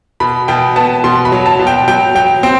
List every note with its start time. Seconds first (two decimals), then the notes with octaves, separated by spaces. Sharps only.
0.20 B2 B5
0.48 B2 G5
0.76 B3 A5
1.04 B2 C6
1.25 B5
1.32 F#3
1.46 A5
1.59 B2
1.67 G5
1.88 F#3 G5
2.15 F#3 G5
2.43 C4 G5